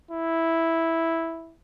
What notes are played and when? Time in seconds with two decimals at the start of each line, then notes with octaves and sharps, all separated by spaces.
0.11 E4